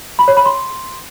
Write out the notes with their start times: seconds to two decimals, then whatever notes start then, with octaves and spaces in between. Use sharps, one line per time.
0.19 B5
0.28 C#5
0.37 B5
0.46 C6